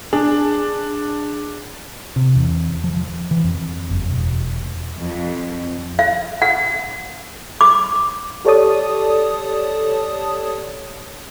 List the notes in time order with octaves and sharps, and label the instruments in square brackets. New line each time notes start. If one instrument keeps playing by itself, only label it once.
[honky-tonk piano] D4 [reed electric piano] G#4
[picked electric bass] C3
E2
F3
F3
E3
F2
F#1
E1
[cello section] F2
[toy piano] F5
F#5
D6
[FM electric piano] G4 A4 C#5 D5 A5 D#6